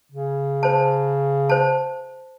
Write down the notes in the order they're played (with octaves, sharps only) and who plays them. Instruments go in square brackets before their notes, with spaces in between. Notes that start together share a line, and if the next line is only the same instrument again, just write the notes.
[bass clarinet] C#3
[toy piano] C5 A5
C5 A5